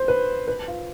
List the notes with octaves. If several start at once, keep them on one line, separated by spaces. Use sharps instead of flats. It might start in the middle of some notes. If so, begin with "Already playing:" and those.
Already playing: C5
B4
B4
F4